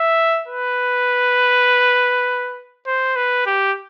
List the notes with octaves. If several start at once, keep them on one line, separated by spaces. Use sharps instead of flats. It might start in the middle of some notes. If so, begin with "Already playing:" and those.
Already playing: E5
B4
C5
B4
G4